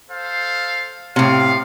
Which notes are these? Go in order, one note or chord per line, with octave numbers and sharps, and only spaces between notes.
A4 C5 F5
A2 C3 F5